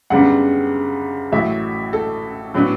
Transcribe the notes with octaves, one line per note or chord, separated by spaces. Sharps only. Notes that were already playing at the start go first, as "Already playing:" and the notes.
F#2 C#3 G3 B3 D4 F#5
A1 A2 F#3 E5
A4
A2 F#3 B3 D4